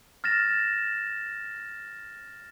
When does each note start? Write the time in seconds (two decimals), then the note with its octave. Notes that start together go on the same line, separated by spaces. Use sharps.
0.24 F6 A6 A#6 E7